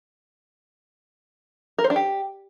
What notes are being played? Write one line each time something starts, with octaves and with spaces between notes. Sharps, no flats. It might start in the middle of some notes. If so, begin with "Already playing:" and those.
A#4
C5
D4
G4